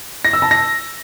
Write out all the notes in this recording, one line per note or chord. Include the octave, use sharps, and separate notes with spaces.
A#6
E6
A5
A#6